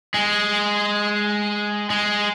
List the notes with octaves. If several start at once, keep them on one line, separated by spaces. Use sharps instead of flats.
G#3
G#3